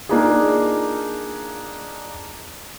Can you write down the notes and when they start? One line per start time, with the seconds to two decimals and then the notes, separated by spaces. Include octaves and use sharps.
0.09 A#3 D4 D#4 F4 G#4